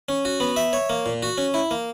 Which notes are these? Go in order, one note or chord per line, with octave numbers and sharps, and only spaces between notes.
C#4
F#4
B3
E5
C#5
A#3
A#2
F#4
C#4
E4
A#3